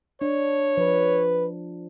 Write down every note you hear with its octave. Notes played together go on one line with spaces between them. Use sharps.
D4 C#5
F3 B4